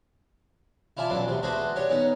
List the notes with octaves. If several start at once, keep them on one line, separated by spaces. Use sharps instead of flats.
E4 F4 D5 G#5 A5
B1 F#2 B2 D4 A4
D2 C3
G#3 A3 D4 F#4 B4 C5
D4 G4 C#5
B3 C#4 D#4